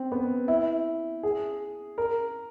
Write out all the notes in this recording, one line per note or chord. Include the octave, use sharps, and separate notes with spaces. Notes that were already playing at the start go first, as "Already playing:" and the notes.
Already playing: C4
B3
E4
G#4
A#4